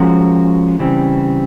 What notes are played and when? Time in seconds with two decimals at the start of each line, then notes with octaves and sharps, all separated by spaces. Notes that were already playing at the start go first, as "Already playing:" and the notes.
Already playing: F3 G#3 C#4 F#4 A#4
0.79 C#3 E3 G3 C4